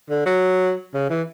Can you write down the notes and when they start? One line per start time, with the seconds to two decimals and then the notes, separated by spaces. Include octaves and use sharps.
0.10 D3
0.26 F#3
0.94 C#3
1.10 E3